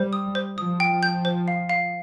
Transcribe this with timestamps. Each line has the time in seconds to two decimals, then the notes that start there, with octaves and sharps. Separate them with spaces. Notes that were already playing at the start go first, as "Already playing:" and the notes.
Already playing: G3 C5
0.13 D#6
0.35 C5
0.58 F3 D#6
0.80 G5
1.03 G6
1.25 C5
1.48 F5
1.69 F5